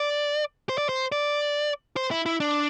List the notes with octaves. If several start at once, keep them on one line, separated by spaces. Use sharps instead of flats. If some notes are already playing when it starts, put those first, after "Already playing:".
Already playing: D5
C5
D5
C5
D5
C5
E4
E4
D4